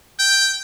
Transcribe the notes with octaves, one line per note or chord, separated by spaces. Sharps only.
G5